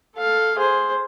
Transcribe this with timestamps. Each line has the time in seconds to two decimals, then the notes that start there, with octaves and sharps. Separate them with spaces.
0.16 A4 F5
0.57 G#4 C5